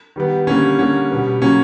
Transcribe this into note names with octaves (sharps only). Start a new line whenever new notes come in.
D#3 G3 B3
D3 G3 A#3 C#4
D3 G3 A#3 C#4
B2 G3 B3
C#3 F#3 A#3 C#4